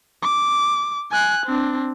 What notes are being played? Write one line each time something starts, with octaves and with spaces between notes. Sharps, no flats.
D6
G#5 F#6
C4 D4